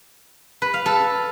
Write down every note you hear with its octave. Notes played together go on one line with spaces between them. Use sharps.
B4
F5
A4